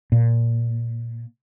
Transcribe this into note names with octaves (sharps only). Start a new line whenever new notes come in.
A#2